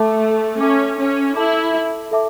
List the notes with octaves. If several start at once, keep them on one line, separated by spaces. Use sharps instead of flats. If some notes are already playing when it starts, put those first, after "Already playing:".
Already playing: A3 A4 E5 A5 D6
C#4 A4 E5 A5 D6
C#4
E4 A4 E5 A5 D6
A4 E5 A5 D6